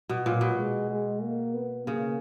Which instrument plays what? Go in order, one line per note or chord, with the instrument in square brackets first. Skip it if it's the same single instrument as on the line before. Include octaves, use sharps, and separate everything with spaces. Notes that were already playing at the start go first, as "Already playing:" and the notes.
[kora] B2
[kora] A#2 [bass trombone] F#3
[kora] B2
[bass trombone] G#3
G#3
A#3
B3
[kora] C#3 [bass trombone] A#3